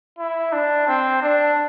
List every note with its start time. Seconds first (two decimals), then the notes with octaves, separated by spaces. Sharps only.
0.19 E4
0.52 D4
0.87 C4
1.22 D4